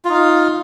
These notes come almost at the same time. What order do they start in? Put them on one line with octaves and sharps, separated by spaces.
F4 D#4 F5